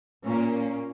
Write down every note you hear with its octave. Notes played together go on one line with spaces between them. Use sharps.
A#2 A#3 C#4